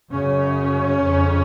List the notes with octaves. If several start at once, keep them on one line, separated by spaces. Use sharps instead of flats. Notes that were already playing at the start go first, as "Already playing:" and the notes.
F#2 C#3 C#4
F2 C#3